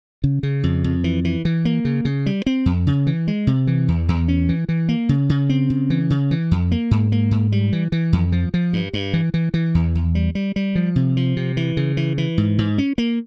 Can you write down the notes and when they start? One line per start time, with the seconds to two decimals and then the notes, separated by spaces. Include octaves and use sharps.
0.24 C#3
0.43 C#3
0.63 F2
0.84 F2
1.04 E3
1.25 E3
1.45 E3
1.65 A#3
1.85 C#3
2.05 C#3
2.26 G3
2.46 C4
2.66 F2
2.87 C#3
3.07 E3
3.28 G#3
3.47 C3
3.67 E3
3.88 E2
4.09 E2
4.28 C#4
4.49 E3
4.69 E3
4.89 A#3
5.09 C#3
5.30 C#3
5.49 C4
5.70 C#3
5.90 E3
6.10 C#3
6.31 E3
6.51 F2
6.72 A#3
6.91 G#2
7.12 A#3
7.31 G#2
7.52 G3
7.73 E3
7.92 E3
8.13 F2
8.32 F3
8.54 F3
8.73 G2
8.93 G2
9.14 E3
9.34 E3
9.54 E3
9.75 E2
9.95 E2
10.15 G3
10.35 G3
10.56 G3
10.75 F3
10.96 C3
11.17 F3
11.37 C3
11.57 E3
11.77 C#3
11.97 E3
12.18 E3
12.38 G#2
12.58 G#2
12.78 C#4
12.98 A#3